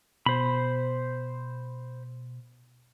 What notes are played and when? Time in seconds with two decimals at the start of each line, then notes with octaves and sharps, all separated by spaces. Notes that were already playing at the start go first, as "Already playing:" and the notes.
0.26 B2 C5 B5